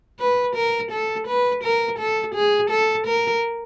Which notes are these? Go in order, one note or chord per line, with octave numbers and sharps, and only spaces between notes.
B4
A#4
A4
B4
A#4
A4
G#4
A4
A#4